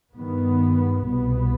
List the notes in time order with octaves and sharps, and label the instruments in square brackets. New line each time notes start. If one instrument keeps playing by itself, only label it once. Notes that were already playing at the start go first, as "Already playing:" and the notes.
[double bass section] G2 D#3 B3
C2 B2 B3